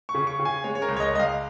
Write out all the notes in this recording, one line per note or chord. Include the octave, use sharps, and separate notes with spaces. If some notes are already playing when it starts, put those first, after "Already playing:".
C#6
C#3
C#6
C#3
G#5
G#3 C#5
C#5
A#4
C#2
C#5
D#5
C#2 D#5
F5